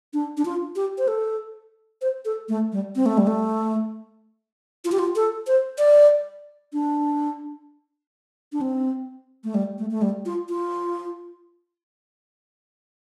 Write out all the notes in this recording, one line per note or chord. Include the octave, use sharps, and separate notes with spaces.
D4
D4
F4
G4
C5
A4
C5
A4
A3
G3
C4
A3
G3
A3
F4
G4
F4
A4
C5
D5
D4
D4
C4
A3
G3
A3
A3
G3
F4
F4